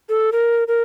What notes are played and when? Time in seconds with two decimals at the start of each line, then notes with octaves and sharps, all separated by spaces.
0.09 A4
0.32 A#4
0.68 A#4